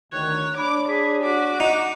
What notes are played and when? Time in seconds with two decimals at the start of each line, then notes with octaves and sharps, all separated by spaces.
0.12 D2 D#3 C#5 F#6
0.57 D4 C#5 B5 D6
0.89 G#4 B6
1.24 F#4 D6
1.60 D#4 F#5